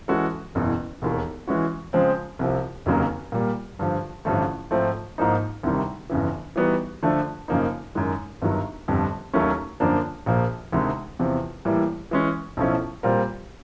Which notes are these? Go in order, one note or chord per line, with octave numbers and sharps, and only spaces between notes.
E3 G#3 C#4 F#4 A4
F#1 E2 B2
E1 D#2 D#3
E3 G#3 C#4 F#4
C#3 F3 G#3 C4
C2 C3 F3
F1 D#2 C#3 F#3 A#3
A#2 G3 A#3
G2 D3 F3
A1 G2 D3 F3 A3
G#2 F3 A3 C4
G#2 F3 A#3 D#4
D2 C3 D#3 G3
G1 F2 C#3 E3
E3 G3 B3 D#4 F#4
D3 F3 A3 D4
F#2 C#3 F3 A#3 D#4
F#2 D#3 G#3
G1 G2 D#3 F#3
G1 F2 D3 G3
D#2 D#3 F#3 A3 C#4
F#2 D3 F3 A#3 D4
A#1 A#2 F3 A#3
D2 C3 D#3 G#3
E2 C3 F3
A2 E3 G3 A#3
E3 G#3 C#4
B1 A2 F3 A3 C#4
A#2 G3 C4 F4 A#4